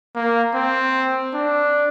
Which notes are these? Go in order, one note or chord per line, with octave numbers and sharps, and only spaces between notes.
A#3
C4
D4